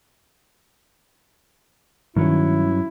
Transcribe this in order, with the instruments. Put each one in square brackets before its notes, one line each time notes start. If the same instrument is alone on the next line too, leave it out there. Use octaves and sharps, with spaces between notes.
[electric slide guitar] G2 F#3 C#4 [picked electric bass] D#3 [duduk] E4